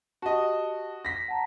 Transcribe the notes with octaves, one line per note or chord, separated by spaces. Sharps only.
F#4 G4 D#5 A5
A#6 B6
F#5 A5 A#5